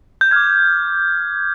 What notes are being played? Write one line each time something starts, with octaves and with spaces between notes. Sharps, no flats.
G6
D6 F6 G#6